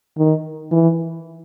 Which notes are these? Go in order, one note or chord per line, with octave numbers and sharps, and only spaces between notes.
D#3
E3